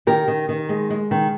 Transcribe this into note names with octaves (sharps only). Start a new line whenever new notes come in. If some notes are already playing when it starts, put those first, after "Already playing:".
D#3 G4 A#4
D#3
D#3
G#3
G#3
D#3